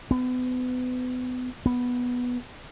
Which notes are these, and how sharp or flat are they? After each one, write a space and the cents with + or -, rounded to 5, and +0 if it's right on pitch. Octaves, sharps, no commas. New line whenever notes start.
B3 +35
B3 -5